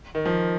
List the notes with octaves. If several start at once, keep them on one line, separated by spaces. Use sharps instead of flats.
D#3
F3